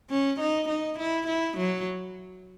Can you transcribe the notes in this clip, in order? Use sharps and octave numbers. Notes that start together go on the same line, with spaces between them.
C#4
D#4
D#4
E4
E4
F#3